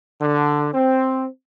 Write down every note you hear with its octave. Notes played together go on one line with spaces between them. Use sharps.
D3
C4